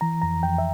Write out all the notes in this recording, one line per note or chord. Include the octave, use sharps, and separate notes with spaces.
E3 A#5
F2 A#5
F2 G5
E5